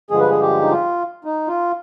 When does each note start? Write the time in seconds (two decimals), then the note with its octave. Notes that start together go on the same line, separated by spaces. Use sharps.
0.10 G2 D3 F3 G#3 G#4
0.20 B4
0.30 G#4
0.41 G4
0.61 D#4
0.71 F4
1.25 D#4
1.48 F4